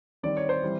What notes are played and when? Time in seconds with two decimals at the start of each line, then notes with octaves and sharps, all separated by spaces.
0.23 D#3 G3 C4 D5
0.37 C#5
0.49 C5
0.62 E3 G3 C4